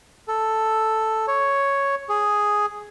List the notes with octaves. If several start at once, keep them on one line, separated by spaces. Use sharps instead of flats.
A4
C#5
G#4